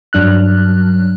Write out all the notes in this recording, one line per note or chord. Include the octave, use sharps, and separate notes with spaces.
G2 F#3 D4 F6 F#6